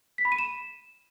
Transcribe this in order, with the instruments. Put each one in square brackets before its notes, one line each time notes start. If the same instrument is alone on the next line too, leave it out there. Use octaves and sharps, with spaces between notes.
[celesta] B6
B5
D#7
E7